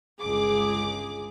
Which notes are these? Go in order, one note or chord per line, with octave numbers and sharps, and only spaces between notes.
G1 C#2 G#4 D6